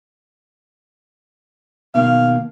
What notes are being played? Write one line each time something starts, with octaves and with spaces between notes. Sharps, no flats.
B2 D#3 A#3 F5